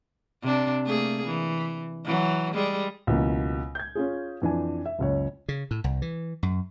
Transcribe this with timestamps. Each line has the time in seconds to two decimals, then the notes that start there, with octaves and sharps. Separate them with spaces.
0.42 C3 C4 D4
0.86 A3 A#3 G#4
1.26 E3
2.05 E3 F#3
2.55 G3 G#3 G#4
3.07 C#2 B2 E3 A#3
3.75 G6 G#6
3.95 C#4 F4 G#4
4.42 F2 E3 D4 G#5
4.86 E5
4.99 F#1 C#2 C#5
5.49 C#3
5.71 A2
5.84 C2
6.02 E3
6.43 F#2